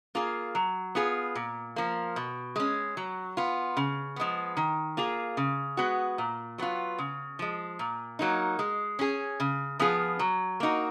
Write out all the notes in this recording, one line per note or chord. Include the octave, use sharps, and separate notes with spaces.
A#3 F4 G#4
F#3
B3 F4 G#4
A#2
F3 A#3
B2
G#3 C#4
F#3
B3 F4
C#3
F3 G#3 B3
D#3
A#3 F4 G#4
C#3
G#3 B3 F#4
A#2
F#3 B3 F4
C#3
F3 G#3
A#2
F#3 A#3 D#4
G#3
C#4 G#4
C#3
F3 B3 F4 G#4
F#3
A#3 D#4 F#4